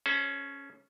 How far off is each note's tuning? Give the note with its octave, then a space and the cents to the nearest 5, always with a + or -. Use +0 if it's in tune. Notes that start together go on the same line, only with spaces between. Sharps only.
C#4 +0 A4 -45 C5 +0